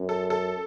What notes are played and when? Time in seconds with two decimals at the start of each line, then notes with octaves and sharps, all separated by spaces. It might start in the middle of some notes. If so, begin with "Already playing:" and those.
Already playing: F#2
0.09 A4
0.30 A4